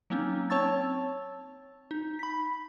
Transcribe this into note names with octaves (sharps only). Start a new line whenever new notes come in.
F#3 A#3 C4 C#4 D#4
C4 C#5 A5 C#6 E6 A6
D#4
B5 B6